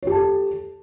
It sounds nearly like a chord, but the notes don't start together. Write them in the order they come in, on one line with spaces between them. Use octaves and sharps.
C#5 G4 A5 A4